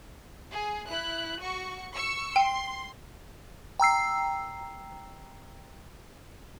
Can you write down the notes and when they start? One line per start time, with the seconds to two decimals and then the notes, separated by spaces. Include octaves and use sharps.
0.52 G#4
0.87 E4 F#6
1.40 F#4 C#6
1.94 C#6 E6 C#7
2.36 G5 C6
3.80 G5 A#5 E6 C7